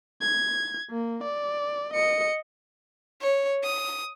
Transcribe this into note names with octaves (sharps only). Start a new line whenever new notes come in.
G#6
A#3
D5
D#5 C#7
C#5
D#6